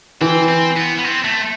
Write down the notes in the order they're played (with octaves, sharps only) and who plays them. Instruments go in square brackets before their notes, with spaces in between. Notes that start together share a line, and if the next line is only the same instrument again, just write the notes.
[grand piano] E3 [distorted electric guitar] C4
[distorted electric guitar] C4
B3
B3
C4
A3